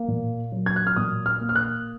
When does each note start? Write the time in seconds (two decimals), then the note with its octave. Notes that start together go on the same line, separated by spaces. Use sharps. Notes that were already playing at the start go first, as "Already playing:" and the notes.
Already playing: A#3
0.08 A#2
0.52 F#3
0.66 G#6
0.76 F#6
0.87 F6
0.96 A#2 D#6
1.26 F6
1.41 A#3
1.49 F6
1.56 F#6